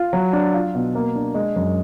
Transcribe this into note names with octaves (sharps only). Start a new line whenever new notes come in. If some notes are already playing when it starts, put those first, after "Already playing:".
Already playing: F4
F#3
D4
F4
B2
A#3
D4
G#3
F#2